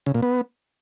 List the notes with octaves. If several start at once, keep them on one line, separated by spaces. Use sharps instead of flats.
C#3
A#2
B3